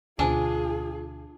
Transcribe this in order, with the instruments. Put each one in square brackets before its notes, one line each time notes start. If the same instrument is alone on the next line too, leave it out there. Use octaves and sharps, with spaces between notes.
[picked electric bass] D2 B2 [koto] D4 [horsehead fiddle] F4 G#4 [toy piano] C5 G#5 A5